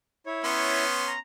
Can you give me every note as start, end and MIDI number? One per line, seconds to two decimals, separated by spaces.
0.26 0.84 64
0.26 0.84 73
0.44 1.14 59
0.44 1.14 61
0.44 1.14 84
1.07 1.19 82